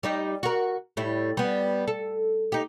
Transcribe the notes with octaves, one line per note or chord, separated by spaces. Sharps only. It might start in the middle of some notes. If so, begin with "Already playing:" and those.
G3 D#4 G4
F#4 A#4
A2 G3 E4
G3 B3
A4
D#4 G4